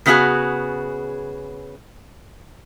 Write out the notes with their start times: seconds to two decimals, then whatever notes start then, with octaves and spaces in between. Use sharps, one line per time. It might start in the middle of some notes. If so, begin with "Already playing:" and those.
0.06 C#3 A3 B3 F4 F#4 G#4